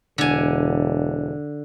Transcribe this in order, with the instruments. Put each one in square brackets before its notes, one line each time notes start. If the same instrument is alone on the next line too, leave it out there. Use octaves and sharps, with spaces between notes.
[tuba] E1 [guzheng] D3 G#5